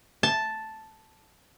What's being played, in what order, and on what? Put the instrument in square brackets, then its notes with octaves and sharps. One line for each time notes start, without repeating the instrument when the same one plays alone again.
[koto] A5